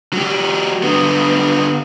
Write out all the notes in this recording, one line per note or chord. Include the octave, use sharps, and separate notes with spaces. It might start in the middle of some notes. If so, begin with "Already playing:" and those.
F#3 G4
D3 B3